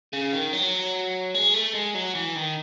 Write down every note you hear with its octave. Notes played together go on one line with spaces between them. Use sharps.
C#3
D#3
F#3
G#3
A3
G#3
F#3
E3
D#3